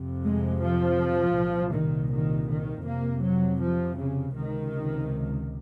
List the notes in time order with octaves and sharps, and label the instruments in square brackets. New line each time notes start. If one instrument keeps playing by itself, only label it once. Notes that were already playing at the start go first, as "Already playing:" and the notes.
Already playing: [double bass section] F2 C3
G#3
F3
C2 A#2
D#3
D#3
D#3
F2 C3 A#3
F#3
F3
C#3
C#2 C3 D#3